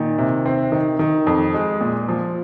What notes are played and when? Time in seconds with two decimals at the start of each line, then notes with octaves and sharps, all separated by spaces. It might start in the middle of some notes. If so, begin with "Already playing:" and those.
Already playing: A#2 D#3
0.18 C3
0.46 C4
0.72 D#3
0.99 D#3
1.27 F2
1.54 G#3
1.81 A#2
2.08 F3